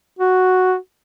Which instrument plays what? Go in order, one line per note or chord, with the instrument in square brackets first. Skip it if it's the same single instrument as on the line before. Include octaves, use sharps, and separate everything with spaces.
[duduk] F#4